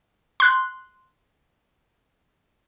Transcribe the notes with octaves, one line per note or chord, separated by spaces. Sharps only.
C6 F#6